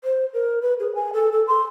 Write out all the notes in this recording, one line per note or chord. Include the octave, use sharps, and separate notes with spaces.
C5
A#4
B4
G#4
G#5
A4
A4
C6